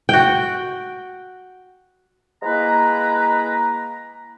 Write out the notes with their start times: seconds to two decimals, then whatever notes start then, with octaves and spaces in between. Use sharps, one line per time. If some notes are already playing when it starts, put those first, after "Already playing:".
0.09 F#4 G5
2.43 G#3 A#3 E4 B4 A#5